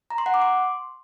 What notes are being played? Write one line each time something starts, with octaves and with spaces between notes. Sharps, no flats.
A#5
C6
F#5
D6
C6